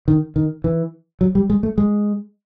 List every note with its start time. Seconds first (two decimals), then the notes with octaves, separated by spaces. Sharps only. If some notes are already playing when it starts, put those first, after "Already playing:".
0.08 D#3
0.36 D#3
0.64 E3
1.21 F#3
1.35 G3
1.50 G#3
1.63 A3
1.78 G#3